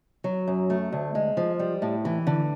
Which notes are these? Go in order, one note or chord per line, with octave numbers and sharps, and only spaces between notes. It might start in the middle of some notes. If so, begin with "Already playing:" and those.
F#3
F#2
A3
D2
G#3
F3
G3
A2
E3
D3